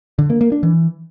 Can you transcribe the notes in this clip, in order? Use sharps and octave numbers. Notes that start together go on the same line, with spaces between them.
D3
A#3
A#3
D4
E3